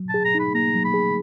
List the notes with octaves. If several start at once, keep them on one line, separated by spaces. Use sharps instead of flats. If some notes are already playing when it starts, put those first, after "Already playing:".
Already playing: F#3
A5
G#4
A#5
D#4 B5
A#3 A#5
F#3
B5
G#4